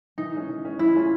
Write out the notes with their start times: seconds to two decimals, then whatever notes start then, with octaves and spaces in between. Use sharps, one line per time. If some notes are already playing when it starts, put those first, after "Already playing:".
0.18 E3 D#4
0.34 G#3 C#4
0.49 E3
0.65 G#3 C#4
0.79 E3 E4
0.94 A3 C#4 F4 G#4